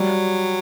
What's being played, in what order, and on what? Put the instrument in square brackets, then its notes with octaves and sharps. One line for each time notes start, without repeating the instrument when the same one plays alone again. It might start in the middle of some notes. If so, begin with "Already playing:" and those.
Already playing: [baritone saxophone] F#3 [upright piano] G3